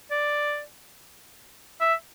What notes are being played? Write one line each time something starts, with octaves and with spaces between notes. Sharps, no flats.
D5
E5